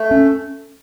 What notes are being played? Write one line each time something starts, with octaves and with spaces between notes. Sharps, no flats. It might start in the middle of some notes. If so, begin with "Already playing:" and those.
Already playing: A3
C#4